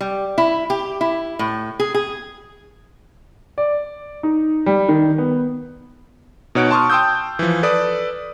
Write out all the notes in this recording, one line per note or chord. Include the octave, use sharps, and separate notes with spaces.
G3
E4
G4
E4
A2
G#4
G#4
D5
D#4
G3
D#3
B3
B2 D#4 C#5 F#5 F#6 D7
A5 C6 C#6 D#6 F6
G5 A5 C6 D#6 E6 G6
E3 F3
A4 B4 D5 D#6